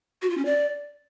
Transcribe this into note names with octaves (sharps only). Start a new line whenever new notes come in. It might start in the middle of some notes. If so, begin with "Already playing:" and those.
F#4
F4
C#4
D5